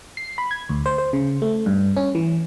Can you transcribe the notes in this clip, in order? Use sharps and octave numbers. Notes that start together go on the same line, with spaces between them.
C7
B5
G#6
D2
C5
C5
C#3
A3
G2
C#4
E3